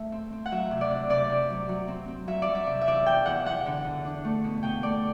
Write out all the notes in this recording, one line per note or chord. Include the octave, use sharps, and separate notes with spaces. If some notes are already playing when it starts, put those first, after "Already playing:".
Already playing: A3 E5
C4
C4
F#5
F#3 E5
C3
D5
D4
C3 D5
C3
F#3
F#3
C4
C4
F#3 E5
D5
F#3
E5
C3
E5
E2 D5
E2 G5
E2 F#5
E2 F#5
D3
D3
D4
A3
B2
B2 G5
A3 D5